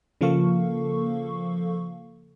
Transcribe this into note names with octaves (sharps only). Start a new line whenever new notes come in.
C#3 F3 A#3 A4 F5 C#6